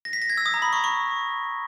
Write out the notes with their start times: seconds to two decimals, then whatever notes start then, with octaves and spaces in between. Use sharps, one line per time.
0.05 A#6
0.13 B6
0.22 A#6
0.30 G#6
0.38 E6
0.46 D#6
0.54 A#5
0.62 B5
0.73 C#6
0.84 C#6